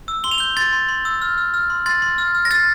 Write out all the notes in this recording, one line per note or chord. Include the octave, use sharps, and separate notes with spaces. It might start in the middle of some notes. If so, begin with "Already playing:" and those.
E6
C6 G7
F7
G6 G7
C6 A6
C6
C6
E6
F6
F6
F6
C6
C6 A6
C6
F6
F6
A#6
F6 A6